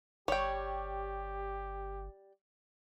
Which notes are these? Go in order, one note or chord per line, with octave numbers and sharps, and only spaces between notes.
G1 G3 G4 C#5 G5